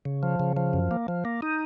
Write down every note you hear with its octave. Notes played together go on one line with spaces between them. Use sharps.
C#3
F3
C#3
F3
F#2
A#3
F3
A#3
D#4